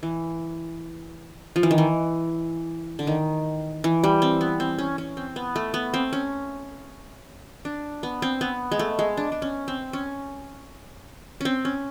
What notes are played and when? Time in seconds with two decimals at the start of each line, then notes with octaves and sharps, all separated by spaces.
0.03 E3
1.56 F3
1.63 E3
1.71 D#3
1.78 E3
2.99 D3
3.07 D#3
3.84 E3
4.04 G3
4.22 C4
4.41 B3
4.60 C4
4.79 C#4
4.98 C#4
5.17 C4
5.36 B3
5.56 A3
5.74 B3
5.94 C4
6.13 C#4
7.65 D4
8.03 B3
8.22 C4
8.41 B3
8.72 G#3
8.79 A3
8.99 G#3
9.17 D4
9.32 D4
9.42 C#4
9.68 C4
9.93 C#4
11.41 C4 C#4
11.65 C#4